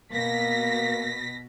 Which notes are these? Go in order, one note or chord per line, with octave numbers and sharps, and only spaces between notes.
B2 A#3 A#6 B6